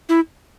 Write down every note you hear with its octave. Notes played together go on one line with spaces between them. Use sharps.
E4